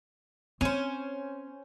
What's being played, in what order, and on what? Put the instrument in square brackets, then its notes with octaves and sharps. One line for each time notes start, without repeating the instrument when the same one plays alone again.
[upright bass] C4 [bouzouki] C#4 C5